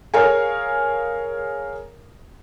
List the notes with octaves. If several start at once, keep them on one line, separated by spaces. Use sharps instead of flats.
G#4 A#4 C#5 F5 G#5